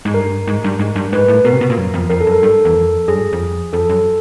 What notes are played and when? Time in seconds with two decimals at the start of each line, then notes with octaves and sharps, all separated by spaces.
0.05 G#2
0.14 G2 A#4
0.47 G#2
0.64 G2
0.79 G#2
0.96 G2
1.13 G#2 B4
1.28 A2
1.44 B2 A#4
1.53 C3
1.61 B2
1.70 A#2
1.78 F#2
1.94 F2
2.10 F2 A#4
2.20 A4
2.27 F#2
2.32 A#4
2.42 G2 A4
2.65 E2
2.75 F2
3.08 F#2 G#4
3.16 G2
3.33 F2
3.73 F2 A4
3.89 F#2